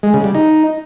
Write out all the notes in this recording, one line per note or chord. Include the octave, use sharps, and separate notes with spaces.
G#3
C#3
G3
D#4